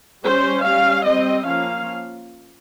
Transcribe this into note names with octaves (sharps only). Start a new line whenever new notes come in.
G3 C#4 C5
G3 C#4 F5
G3 C4 D#5
F3 A#3 C#4 F5